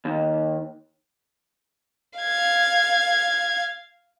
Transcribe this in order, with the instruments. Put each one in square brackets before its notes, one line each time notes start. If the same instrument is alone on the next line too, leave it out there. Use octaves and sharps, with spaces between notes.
[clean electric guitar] D#2
[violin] F5 G#6